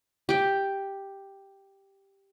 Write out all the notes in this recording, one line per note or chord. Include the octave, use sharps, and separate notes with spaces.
G4 G5